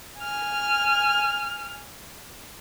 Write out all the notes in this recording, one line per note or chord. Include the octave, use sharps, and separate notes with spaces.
G#5 F6